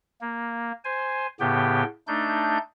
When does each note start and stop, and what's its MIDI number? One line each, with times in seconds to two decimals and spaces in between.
0.21 0.72 58
0.85 1.27 72
0.85 1.27 80
1.40 1.83 45
1.40 1.83 49
1.40 1.83 59
1.40 1.83 67
1.40 1.83 79
2.08 2.58 57
2.08 2.58 62
2.08 2.58 63
2.08 2.58 91